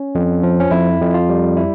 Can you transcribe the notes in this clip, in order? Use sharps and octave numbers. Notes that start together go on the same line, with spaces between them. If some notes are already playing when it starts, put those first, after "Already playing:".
Already playing: C#4
F2
F3
C#4
F2 E4
F2
F4
G3
E4